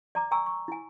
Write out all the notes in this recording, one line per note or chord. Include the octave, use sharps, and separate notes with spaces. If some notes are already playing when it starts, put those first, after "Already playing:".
D5 A#5 D6
G5 G#5 A#5 C#6 E6
C#6
E4 G#5